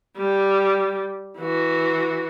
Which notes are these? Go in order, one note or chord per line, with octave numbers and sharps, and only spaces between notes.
G3
E3 F#4